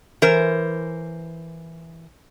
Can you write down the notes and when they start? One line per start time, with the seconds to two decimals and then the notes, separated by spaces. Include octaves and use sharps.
0.22 E3 A#4 C5